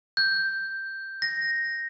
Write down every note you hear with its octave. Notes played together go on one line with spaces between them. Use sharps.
G6
A#6